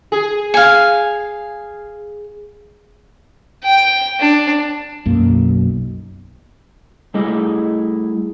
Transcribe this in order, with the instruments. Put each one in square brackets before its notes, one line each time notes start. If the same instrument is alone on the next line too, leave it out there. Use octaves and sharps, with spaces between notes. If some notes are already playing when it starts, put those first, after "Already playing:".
[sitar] G#4
[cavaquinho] F5 G#5
[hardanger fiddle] G5
D4
[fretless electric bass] B1 F#2 A#3
[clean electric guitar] G3 A3 E4 G#4 D#5